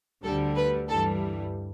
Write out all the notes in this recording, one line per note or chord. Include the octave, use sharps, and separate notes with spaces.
D2 D3 G3 A4
B4
G2 E3 G3 A4